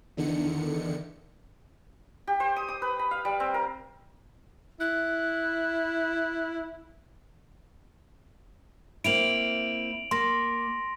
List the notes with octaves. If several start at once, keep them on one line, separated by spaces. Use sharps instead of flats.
E2 D3 D#3 C#7
G4
C5
D#6
D#6
B4
B5
F5
G3
C4
A#4
E4 F#6
A#3 C4 E4 D7 F7 F#7
A#3 C6 A#6